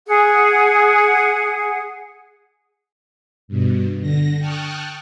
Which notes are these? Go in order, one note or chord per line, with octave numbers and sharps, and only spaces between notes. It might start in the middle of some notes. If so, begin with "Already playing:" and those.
G#4 F#5
G2 B2
D3 A#6
G5 A5 C#6 D#6 F6 F#6